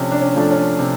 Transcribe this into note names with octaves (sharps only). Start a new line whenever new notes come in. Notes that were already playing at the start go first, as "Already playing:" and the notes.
Already playing: C3 F3 A3 C#4 D4
D4
C#4
F3 A3 D4
C#4
C3